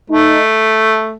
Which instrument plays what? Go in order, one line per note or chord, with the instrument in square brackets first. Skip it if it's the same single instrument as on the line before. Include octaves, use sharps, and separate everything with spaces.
[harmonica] A3 [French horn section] D#4